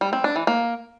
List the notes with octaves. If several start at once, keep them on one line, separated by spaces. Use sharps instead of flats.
G3
C4
D4
E3
A#3